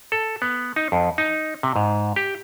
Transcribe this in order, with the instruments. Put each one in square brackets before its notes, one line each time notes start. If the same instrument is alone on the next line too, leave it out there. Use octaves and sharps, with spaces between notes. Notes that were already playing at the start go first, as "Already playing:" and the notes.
[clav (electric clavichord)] A4
B3
D#4
F2
D#4
C3
G#2
G4